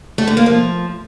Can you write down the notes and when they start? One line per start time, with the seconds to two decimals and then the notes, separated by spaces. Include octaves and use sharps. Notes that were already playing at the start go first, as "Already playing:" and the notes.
0.18 A3
0.27 D3
0.37 A#3
0.46 F3